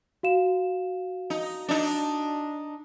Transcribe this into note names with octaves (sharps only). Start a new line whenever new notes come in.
F#4 F5 E7
D#4
D4 D#4